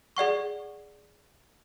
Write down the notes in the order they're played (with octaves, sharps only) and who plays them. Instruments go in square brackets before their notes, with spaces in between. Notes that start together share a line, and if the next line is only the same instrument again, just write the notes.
[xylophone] G#4 D5 F#5 C#6